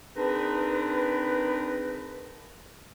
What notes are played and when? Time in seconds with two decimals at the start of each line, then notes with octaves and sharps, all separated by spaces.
0.16 C4 D4 D#4 G#4 A#4 B4